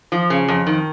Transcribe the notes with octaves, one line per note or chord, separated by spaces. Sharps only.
F3
C#3
F2
D#3